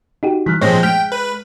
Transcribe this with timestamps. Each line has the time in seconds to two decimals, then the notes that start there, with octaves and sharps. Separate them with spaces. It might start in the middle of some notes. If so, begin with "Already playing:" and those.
0.23 D#4 F#4 G4
0.46 E3 G3 F6 F#6 B6
0.61 G2 A#2 F3 G#3 C4 C#5 C6 A#6
0.83 G#3 G5 F6 G6 B6
1.12 B4